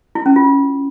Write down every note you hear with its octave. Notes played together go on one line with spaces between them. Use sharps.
E4
C#4
F4